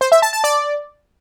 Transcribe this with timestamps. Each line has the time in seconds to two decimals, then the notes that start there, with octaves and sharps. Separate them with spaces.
0.01 C5
0.12 E5
0.22 A5
0.33 A5
0.44 D5